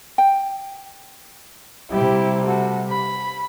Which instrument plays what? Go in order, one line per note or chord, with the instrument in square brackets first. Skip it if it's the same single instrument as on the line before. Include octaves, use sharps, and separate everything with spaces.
[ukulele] G5
[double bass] C3 G3 [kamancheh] E4 G4
[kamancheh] A3 F#4
B5